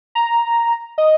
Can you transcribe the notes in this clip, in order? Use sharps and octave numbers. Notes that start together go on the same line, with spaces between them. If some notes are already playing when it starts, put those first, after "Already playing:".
A#5
D#5